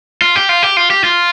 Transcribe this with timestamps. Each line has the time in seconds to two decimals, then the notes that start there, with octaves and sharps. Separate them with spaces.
0.22 F4
0.36 G4
0.49 F4
0.63 G4
0.77 F4
0.90 G4
1.04 F4